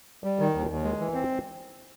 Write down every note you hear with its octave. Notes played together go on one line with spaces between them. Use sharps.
G3
D#3
D#2
D#2
G#3
E3
C4